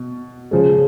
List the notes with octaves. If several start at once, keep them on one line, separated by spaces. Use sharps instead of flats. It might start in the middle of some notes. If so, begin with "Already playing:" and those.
Already playing: B2
C#3 F3 G#3